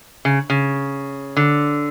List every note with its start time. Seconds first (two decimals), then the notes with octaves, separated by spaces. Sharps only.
0.25 C#3
0.50 C#3
1.37 D3